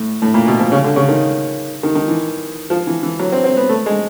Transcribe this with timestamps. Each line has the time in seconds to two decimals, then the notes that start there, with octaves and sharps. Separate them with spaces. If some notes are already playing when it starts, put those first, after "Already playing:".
Already playing: A2
0.22 A2
0.34 A#2
0.47 B2
0.59 F3
0.72 C#3
0.84 D3
0.96 C#3
1.08 D#3
1.83 D#3
1.95 D#3
2.08 E3
2.70 F3
2.87 E3
3.03 E3
3.19 F#3
3.32 C4
3.44 C4
3.57 B3
3.69 A3
3.86 G#3